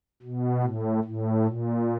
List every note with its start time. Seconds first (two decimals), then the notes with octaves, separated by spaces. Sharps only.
0.22 B2
0.63 A2
1.04 A2
1.45 A#2